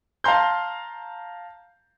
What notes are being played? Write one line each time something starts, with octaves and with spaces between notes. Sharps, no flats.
F5 A5 A#5 C6 G6